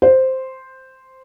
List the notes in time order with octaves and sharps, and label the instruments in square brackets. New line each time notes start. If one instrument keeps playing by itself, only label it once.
[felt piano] C5